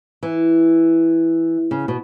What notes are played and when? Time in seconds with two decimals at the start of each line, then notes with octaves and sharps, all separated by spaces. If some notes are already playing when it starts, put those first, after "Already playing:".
0.23 E3
1.71 C#3
1.88 B2